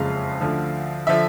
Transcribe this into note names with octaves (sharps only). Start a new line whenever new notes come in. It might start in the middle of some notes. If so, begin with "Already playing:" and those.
Already playing: F#1 F2 C#3 F3 G#3 F5
D2 D3 F3
D3 F3 E5